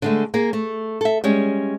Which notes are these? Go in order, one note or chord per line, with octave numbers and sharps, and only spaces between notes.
D3 G#3 A3
A#3 G#4 A#4
A3
A4 E5
G3 G#3 C#4